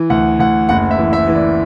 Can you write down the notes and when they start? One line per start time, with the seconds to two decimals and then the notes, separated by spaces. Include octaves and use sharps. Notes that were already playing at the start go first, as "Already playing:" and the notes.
Already playing: E3
0.10 D2 F#5
0.39 D2 F#5
0.69 F#1 F#5
0.91 E5
0.98 E3
1.13 E5
1.27 E3
1.35 D5